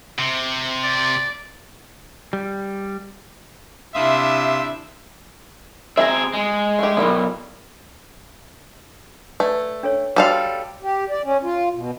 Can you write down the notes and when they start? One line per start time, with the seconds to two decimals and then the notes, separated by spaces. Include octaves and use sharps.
0.19 C3
0.84 D5
2.33 G3
3.95 C3 D4 E4 E5 F5 C6 D#6
5.97 C4 G#4 E5 A#5
6.34 G#3
6.79 A3 G4
6.97 B1 E2 D#3 G3 E4
9.40 A3 B4 D5
9.83 D4 A4 C#5
10.16 G3 F#4 A4 C#5 F5
10.83 G4
11.10 D5
11.24 C#4
11.44 F4
11.75 B2